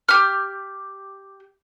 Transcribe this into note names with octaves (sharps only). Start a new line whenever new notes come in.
G4 F6